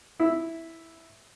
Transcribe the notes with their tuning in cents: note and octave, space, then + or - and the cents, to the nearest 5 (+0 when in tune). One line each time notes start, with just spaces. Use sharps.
E4 -5